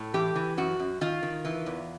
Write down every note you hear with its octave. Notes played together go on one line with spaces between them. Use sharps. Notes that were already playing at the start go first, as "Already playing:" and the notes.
Already playing: A2
E3 G4
E3
F#2 F#4
F#2
D#3 F4
D#3
E3
E2